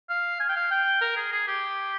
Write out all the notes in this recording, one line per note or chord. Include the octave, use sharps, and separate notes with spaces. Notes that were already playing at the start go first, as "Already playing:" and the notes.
F5
G#5
G5
F5
G5
A#4
G#4
G#4
G4